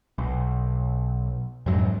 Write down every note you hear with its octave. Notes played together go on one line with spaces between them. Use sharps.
B1
F2 G#2 F#3